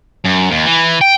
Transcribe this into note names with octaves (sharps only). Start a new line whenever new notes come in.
F#2
D#2
E3
G5